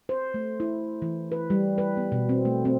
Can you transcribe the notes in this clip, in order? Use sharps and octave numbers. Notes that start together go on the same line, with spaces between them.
C5
A3
E4
E3
B4
G3
B4
B3
B2
C4
A3
C4